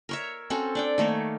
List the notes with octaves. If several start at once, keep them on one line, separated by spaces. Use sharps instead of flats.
A#4 C#5 E5
C4 C#4 F#4 A4
D4 D5 G5
D#3 A3 A#3 C#5